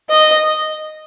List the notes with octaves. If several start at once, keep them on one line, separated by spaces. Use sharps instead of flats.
D#5